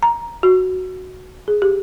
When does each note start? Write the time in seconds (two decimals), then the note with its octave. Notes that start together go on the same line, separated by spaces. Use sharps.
0.03 A#5
0.43 F#4
1.48 G#4
1.62 G4